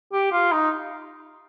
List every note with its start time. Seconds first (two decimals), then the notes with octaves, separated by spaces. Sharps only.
0.12 G4
0.32 F4
0.52 D#4